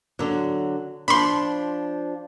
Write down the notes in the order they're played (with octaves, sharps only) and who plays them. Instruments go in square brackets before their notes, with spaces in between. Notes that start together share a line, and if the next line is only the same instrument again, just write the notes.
[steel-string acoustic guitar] D3 F#3
[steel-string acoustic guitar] F3 D4 [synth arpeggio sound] B5 C6